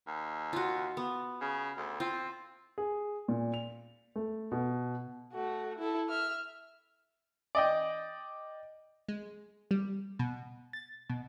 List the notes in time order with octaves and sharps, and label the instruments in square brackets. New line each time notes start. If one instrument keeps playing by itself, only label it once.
[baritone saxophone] D#2
[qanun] F4 F#4
B3
[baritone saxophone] C#3
D2
[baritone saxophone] C4 [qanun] F4
[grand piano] G#4
A#2
F7
A3
B2
[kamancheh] A3 F#4
E4 A4
E5 F6
[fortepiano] D5 D#5 G5
[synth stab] G#3
G3
B2
A6
B2